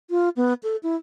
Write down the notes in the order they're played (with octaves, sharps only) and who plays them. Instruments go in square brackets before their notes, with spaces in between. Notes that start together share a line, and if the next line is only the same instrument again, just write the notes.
[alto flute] F4
B3
A4
E4